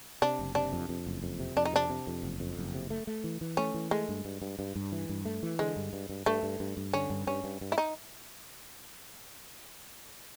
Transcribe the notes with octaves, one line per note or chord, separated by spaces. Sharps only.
C3 D4
F#1
C3 D4
F2
F2
F#1
F2
C3
F2 D4
D#4
C3 D4
C3
F2
F#1
F2
F#1
C3
A3
A3
E3
E3
A3 C#4
E3
G#3 A3
G2
G2
G2
G2
G2
E3
G2
A3
E3
D3 G#3
G2
G2
G2
G2 A3
G2
G2
G2
D3 C#4
G2
G2 C#4
G2
G2
E4
D#4